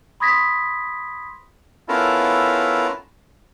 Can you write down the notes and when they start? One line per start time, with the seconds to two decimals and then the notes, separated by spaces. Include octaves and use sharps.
0.20 B5 C6 D#6 G#6 A#6 B6
1.89 B3 C#4 E4 F4 A4 A#4